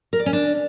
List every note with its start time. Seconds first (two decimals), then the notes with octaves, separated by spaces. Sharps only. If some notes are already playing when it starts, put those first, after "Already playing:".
0.13 A#4
0.20 D5
0.26 C#4
0.33 D4